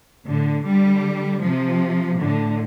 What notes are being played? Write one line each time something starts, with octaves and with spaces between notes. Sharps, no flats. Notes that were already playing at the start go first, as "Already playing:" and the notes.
A2 D3
D3 G3
C3 F3
A2 D3